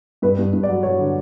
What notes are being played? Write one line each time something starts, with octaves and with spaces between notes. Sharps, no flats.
G2 B4
G2
G2
D5
F#3
F#3 C#5
D3